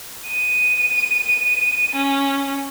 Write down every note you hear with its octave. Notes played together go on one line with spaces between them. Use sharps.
D#7
C#4